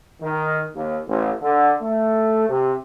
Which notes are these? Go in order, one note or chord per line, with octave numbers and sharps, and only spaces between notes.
D#3
D#2
A1
D3
A3
C3